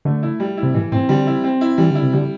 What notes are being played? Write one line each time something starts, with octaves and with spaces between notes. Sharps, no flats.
D3 A3
E4
G3
E4
C3
A2 E3
A2 C4
D3 G3
E4
C4
E4
E3 G3
D3
E4
C3
D3 G3